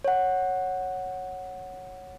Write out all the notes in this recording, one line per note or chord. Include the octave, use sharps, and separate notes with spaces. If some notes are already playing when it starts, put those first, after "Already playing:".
C#5 F#5